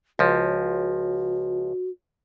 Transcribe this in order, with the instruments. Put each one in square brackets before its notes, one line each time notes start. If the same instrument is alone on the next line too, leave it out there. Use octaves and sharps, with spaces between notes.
[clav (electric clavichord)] C#2 F3 [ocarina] F#4